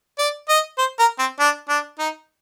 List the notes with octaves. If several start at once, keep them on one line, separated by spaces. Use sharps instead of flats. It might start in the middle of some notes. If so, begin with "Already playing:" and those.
D5
D#5
C5
A#4
C4
D4
D4
D#4